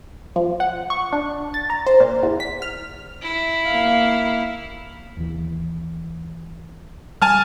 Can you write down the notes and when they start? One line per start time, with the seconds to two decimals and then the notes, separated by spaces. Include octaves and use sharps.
0.36 F3
0.60 F#5
0.90 C#6
1.13 D4
1.54 A6
1.70 A#5
1.86 C5
2.00 A#2
2.23 E2
2.40 B6
2.62 F6
3.22 E4
3.67 A#3 F5
5.17 D#2 E3
7.22 G3 G#5 A5 F6